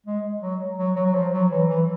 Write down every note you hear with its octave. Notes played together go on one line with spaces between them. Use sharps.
G#3
F#3
F#3
F#3
F#3
F3
F#3
E3
E3